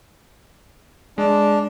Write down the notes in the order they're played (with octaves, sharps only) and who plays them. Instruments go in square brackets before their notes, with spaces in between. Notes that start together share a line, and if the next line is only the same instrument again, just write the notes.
[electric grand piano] G#3 [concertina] D4